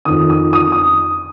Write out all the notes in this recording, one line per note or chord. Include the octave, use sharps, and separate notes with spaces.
F2 D#3 D#6
D#6
D#6
D#6